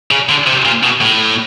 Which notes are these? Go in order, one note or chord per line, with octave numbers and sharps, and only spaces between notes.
C#3
D3
C3
A#2
B2
A2